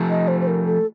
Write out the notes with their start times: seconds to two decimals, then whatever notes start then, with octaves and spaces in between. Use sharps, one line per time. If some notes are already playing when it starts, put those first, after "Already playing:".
Already playing: F3 A3
0.09 D#5
0.28 C5
0.41 C5
0.47 A#4
0.66 A4